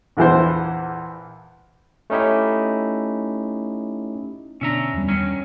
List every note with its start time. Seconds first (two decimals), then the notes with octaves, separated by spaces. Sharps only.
0.17 A#1 E2 E3 C5
2.10 A3 C#4 D#4 E4 G4
4.61 B2 D3 C#4 D4 E5 A#5
4.94 E2 G3
5.08 G2 D#3 C#4